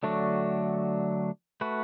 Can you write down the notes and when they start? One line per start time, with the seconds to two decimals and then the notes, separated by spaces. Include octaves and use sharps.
0.03 D3 F#3 A3 D4 F#4
1.61 A3 F#4 B4